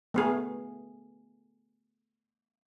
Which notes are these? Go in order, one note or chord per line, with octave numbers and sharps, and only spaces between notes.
A3 B3 G#4